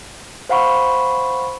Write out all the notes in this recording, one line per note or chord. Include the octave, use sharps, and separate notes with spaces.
C5 F5 F#5 B5 C#6